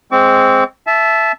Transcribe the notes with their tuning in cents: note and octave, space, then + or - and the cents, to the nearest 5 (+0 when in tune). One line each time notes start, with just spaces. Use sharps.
G#3 +0 C4 +0 C#6 +45
E5 +10 A5 -20